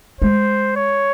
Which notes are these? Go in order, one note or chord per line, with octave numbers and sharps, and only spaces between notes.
G#3 C5
C#5